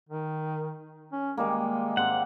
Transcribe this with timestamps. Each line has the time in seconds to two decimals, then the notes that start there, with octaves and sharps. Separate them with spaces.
0.09 D#3
1.12 C#4
1.37 D#3 G3 G#3 A#3
1.97 G#2 C4 F#5